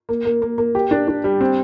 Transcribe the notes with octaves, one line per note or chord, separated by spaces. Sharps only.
A#3
A#3
A#3
A#3
G4
D4
D4
G3
C4